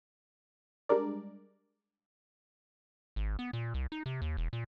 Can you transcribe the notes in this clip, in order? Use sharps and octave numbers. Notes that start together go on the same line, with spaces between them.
G3 G#3 D4 A#4 D5
G#1
B3
A#2
C2
D#4
C3
D#2
E1
A#2